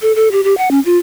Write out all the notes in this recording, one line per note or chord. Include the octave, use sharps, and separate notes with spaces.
A4
A4
G4
G4
F#5
C#4
F4